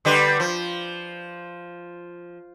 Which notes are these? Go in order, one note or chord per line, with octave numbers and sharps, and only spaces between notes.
D3 G3 B4
F3